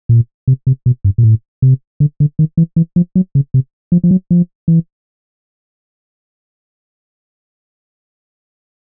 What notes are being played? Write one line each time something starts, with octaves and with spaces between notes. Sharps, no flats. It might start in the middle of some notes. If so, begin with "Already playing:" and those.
A#2
C3
C3
B2
G2
A#2
A2
C3
D3
D3
D#3
E3
E3
F3
F#3
C#3
C3
F3
F3
F#3
F3
E3